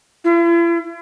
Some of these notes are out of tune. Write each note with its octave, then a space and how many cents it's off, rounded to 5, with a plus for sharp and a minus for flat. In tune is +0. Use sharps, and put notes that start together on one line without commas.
E4 +45